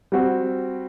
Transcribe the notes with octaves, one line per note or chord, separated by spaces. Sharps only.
G3 C4 F#4